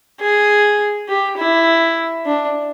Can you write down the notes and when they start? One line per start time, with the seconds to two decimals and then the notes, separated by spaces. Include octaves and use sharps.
0.20 G#4
1.09 G4
1.38 E4
2.26 D4